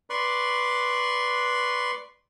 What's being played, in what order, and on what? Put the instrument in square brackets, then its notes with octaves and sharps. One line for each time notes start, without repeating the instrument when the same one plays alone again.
[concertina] B4 D5 C6 C#6 F#6